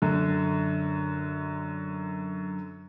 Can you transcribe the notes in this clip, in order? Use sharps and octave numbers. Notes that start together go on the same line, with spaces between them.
F#2 D3